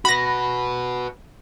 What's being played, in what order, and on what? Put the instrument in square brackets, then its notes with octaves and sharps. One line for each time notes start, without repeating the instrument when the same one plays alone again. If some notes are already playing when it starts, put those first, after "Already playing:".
[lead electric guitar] F#4 B4 [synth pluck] B5 A#6